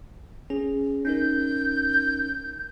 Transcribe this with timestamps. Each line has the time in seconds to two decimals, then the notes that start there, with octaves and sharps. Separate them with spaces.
0.50 C#4 G#4
1.05 C#4 D#4 A#4 G6